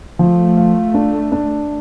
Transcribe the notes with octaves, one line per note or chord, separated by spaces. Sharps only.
F3 A3
F4
D4
D4